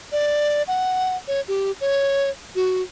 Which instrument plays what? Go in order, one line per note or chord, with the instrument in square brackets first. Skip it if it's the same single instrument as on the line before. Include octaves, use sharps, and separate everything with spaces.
[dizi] D5
F#5
C#5
G4
C#5
F#4